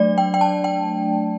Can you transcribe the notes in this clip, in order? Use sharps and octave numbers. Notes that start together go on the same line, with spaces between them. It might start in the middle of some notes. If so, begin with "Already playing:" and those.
Already playing: F#3 A3 D4 D5
G5
G5
A5
G5